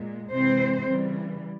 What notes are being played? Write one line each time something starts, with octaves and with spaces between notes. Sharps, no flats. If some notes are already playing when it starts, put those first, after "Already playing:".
Already playing: A#2 G#3
C3 E3 G#3 C4 C5
C#3 E3 G3